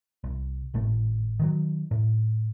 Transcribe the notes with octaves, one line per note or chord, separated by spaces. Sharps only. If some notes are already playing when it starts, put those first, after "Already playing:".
C2
G#1 A2 A3
D#3 F3 F#3
A2